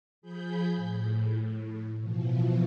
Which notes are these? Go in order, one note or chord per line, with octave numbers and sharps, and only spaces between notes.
F3 G#4 B5 G6
A2
B2 E3 F3